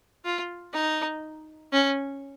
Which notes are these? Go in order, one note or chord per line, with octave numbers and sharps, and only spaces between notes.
F4
D#4
C#4